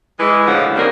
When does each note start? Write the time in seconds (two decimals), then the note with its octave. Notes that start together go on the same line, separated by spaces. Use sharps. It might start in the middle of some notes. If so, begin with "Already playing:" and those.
0.19 E3 G#3
0.47 D2 A2 C#3 F3 F5 F#5
0.75 C3 D#3 G3 A#3 C4 A#4